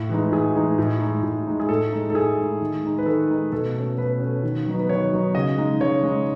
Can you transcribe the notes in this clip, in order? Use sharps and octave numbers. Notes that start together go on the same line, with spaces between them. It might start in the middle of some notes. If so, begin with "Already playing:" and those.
Already playing: A2
E3 G#3 D#4
A2 G#4
E3 G#3 D#4
A2
G#3 D#4
A2
G#3 D#4
G#4
A2 A4
G#3 D#4
A4
A2 G#4
G#3 D#4
D#3
G#3 D#4
B4
D#3 A4
G#3 D#4
B2 A4
A3 C#4
B2 B4
A3 C#4
D#3
F#3 B3 D#4
B4
D#3 C#5
F#3 B3 D#4
C#3 D#5
G#3 D#4
C#3 C#5
G#3 D#4